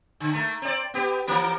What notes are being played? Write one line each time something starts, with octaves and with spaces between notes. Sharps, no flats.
D3
A3 A#3
C4 D5
B3 G4
E3 A#3 A#4